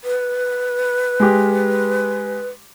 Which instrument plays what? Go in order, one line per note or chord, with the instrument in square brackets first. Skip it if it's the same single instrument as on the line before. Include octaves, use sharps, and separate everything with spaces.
[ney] B4
[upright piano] G#3 G4